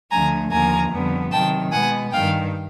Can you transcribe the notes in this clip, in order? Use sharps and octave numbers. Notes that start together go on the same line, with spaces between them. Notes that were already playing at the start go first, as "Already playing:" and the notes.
D2 D3 F3 A3 G#5 A#5
D#2 D3 F3 A#3 G#5 A#5
F2 D3 G3 B3
C3 D#3 F#3 G5 A5
B2 G#3 B3 F#5 G#5
G2 D#3 G3 F5 G5